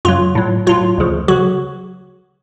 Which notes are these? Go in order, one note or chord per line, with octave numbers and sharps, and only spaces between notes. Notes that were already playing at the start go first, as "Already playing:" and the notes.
F#2 C#3 F#3 F4
A2 F#3
A2 F#3 F4
D2 C#3 F3
C#3 F#3 F#4